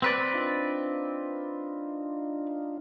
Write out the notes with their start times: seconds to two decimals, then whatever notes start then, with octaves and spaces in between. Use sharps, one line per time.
0.02 C4 B4 D5
0.34 D4 D#4 F4